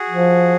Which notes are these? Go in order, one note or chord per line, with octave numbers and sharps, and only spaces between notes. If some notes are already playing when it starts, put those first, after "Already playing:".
Already playing: F#4 G#4
F3